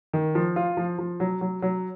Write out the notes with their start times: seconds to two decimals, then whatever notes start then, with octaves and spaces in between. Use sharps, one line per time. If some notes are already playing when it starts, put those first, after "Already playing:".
0.13 D#3
0.35 F3
0.56 F4
0.77 F3
0.99 F3
1.20 F#3
1.41 F#3
1.62 F#3